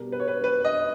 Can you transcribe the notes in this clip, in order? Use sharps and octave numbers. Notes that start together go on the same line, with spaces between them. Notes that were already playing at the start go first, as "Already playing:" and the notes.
Already playing: B2 G3 B3 A#4
B4
C#5
B4
B4
D#5